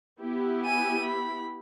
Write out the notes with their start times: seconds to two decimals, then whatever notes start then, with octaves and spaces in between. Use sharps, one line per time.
0.20 B3 E4 G4
0.66 G#5 D#7
1.03 B5